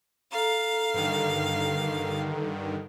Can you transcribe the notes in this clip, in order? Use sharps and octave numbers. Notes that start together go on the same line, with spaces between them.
A4 F5 A#5
G2 D3 D#3